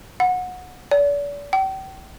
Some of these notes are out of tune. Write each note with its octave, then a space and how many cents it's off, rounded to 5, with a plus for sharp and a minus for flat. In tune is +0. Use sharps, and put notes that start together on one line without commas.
F#5 -20
D5 -40
G5 -35